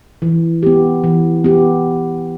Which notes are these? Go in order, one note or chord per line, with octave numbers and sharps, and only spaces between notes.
E3
B3 G4
E3
B3 G4